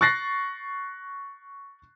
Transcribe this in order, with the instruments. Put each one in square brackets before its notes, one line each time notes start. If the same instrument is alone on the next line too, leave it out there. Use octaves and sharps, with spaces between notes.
[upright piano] C#6 F#6 A6 A#6 C7